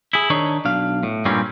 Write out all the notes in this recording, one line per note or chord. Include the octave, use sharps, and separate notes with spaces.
E4 G#4
D#3 D4 D#4 C#5
B1 D4 F5
A2
G2 A#2 G3 C4 C#4